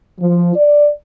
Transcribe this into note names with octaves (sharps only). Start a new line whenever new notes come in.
F3
D5